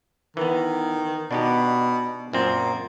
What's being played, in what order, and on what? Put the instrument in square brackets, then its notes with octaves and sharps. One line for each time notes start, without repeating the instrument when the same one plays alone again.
[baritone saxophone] D#3 [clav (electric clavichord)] E3 B3
[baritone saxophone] B2 [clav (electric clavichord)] D4 D#4 G4
[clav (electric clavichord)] F#2 C4 [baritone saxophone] A#2